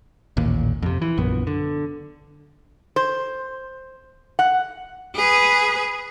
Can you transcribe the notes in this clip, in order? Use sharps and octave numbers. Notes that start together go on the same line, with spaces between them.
A1 D#2 A#2
F2 C3
E3
A#1 F#2 B3
D3
C5
F#5
G#4 B4